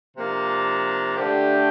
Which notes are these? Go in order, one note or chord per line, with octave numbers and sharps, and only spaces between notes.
C3 F3 A#3 D4
D3 A3 D4 G4